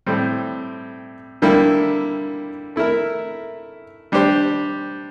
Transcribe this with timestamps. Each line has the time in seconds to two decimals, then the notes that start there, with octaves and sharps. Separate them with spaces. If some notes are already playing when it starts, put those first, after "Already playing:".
0.06 A2 G3 C4
1.42 D3 G3 A#3 E4
2.76 A3 E4 A#4 E5
4.12 G3 D4 G4 C5